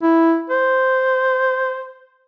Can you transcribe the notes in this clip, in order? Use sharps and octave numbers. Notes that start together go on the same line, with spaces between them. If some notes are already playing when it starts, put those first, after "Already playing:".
E4
C5